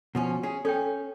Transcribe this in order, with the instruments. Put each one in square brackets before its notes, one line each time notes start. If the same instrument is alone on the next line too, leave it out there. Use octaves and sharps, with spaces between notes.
[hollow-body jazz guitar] B2 F3 C#4
C#4 G#4
[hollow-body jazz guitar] C#4 [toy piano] A4 C#5 G5